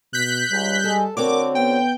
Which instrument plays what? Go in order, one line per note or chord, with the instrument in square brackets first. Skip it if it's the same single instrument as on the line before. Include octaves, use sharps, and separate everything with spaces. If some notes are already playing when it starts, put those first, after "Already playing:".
[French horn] B2 [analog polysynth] F#6 G6 B6
[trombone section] C#2 [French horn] G3
[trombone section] G#3 G#4 [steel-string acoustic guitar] A4
[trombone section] D3 [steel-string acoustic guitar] C4 F#4 C#5 [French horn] A#4 [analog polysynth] D6
[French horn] B3 [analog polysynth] G5